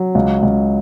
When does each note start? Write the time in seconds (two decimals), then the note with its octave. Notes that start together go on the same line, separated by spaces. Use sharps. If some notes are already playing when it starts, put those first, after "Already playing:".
Already playing: F#3
0.15 C#2
0.43 C#2